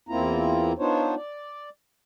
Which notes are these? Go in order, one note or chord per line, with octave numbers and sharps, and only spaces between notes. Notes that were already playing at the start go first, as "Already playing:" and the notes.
E2 A#3 C4 E4 F4 A#5
B3 D4 D#4 F4 C5 C#5
D5